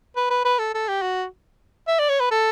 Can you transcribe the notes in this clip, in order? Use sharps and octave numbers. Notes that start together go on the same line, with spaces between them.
B4
B4
B4
A4
A4
G4
F#4
E5
D5
C#5
B4
A4